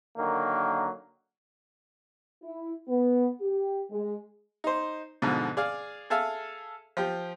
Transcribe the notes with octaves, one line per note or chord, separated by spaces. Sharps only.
D3 D#3 F#3 A#3
E4
B3
G4
G#3
D#4 C5
G#2 B2 D3 F3
G#4 D5 F5
G#4 A4 E5 F5
F3 G4